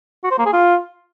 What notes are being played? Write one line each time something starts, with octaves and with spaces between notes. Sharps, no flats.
F#4
C5
A#3
G#4
F4